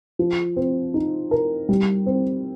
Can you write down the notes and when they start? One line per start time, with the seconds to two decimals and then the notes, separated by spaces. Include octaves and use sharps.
0.19 F3
0.56 C4
0.94 D#4
1.31 A#4
1.69 G3
2.06 C4